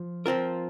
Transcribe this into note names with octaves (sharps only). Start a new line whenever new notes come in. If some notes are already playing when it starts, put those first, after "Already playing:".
Already playing: F3
F3 C4 F4 A#4